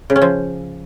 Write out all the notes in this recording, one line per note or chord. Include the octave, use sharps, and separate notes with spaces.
C#3
C#4
F3